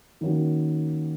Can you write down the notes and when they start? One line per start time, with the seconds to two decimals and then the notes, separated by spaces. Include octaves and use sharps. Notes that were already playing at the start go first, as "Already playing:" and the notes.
0.21 D#3 A#3 C#4 F#4